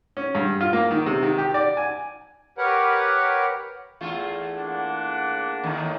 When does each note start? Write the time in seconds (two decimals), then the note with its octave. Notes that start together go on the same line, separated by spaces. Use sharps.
0.17 C#4
0.35 G2
0.61 F4
0.73 A#3
0.91 D#3
1.06 C3
1.23 D#3
1.38 G4
1.54 D5
1.77 G#5
2.58 G4 A#4 B4 C#5 F#5
4.01 E2 A3 F4
4.57 A#3 D4 F#5
5.63 D#2 A2 D#3